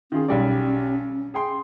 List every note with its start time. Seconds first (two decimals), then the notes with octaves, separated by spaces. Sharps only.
0.12 D#3 C#4 F4 G#4
0.28 B1 G3 D5
1.34 G#4 G5 C6